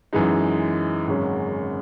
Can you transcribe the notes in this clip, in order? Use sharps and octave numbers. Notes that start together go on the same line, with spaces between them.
F#2 E3 G#3 D#4
G#1 F#2 C#3 G#3 C#4